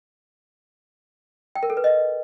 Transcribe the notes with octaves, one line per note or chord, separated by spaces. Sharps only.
G5
A#4
A4
B4
D#5